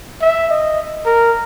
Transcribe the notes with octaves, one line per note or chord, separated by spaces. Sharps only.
E5
D#5
A#4